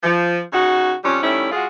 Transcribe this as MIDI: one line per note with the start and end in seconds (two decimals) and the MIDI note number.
0.03 0.39 53
0.53 0.92 49
0.53 0.92 63
0.53 0.92 66
1.04 1.21 41
1.04 1.21 55
1.04 1.21 61
1.22 1.49 51
1.22 1.49 55
1.22 1.49 57
1.22 1.49 61
1.22 1.49 64
1.52 1.65 56
1.52 1.65 65
1.52 1.65 66
1.52 1.65 68